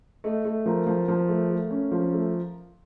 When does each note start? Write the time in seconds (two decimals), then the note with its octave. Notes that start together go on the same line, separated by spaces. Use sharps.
0.24 A3 D#5
0.45 A3
0.66 F3 A#4
0.87 F3
1.08 F3
1.28 A3
1.49 A3
1.71 C#4
1.91 F3
2.12 A3